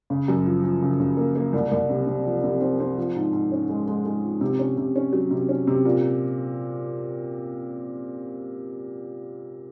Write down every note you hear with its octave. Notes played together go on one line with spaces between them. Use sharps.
C#3
F#2
F3
F3
C#3
C#3
A#3
A#3
C2
C2
C3
C3
F3
C3
C4
C4
F3
G#2
G#2
C#4
G#3
G#3
G#3
F3
C3
C#4
C3
C#4
F#3
C3
C#4
C3
A#2